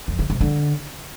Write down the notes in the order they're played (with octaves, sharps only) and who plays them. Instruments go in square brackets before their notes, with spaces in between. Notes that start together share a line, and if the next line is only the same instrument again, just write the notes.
[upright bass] F2
C#3
C3
D3